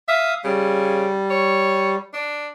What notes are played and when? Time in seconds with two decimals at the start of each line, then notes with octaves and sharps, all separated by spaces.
0.08 E5 F5 D#6
0.44 C#3 G3
1.30 C#5
2.13 D4